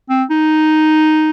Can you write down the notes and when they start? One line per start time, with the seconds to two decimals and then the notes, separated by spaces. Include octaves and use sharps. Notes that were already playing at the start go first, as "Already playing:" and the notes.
0.10 C4
0.31 D#4